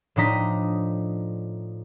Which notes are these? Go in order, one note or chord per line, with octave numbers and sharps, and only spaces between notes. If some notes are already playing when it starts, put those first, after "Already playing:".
A2 F3 D4 D#4 A#5 B6